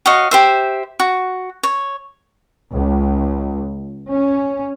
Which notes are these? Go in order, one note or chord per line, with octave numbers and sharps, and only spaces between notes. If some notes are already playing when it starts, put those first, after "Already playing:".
F#4 C#5 D#5 F5
G4 C5 E5
F#4
C#5
C#2
C#4